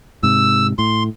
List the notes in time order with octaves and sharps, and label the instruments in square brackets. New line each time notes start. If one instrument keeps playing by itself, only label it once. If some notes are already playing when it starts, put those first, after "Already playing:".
[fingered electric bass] G#2 C3 [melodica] E6
[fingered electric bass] A2 [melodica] C6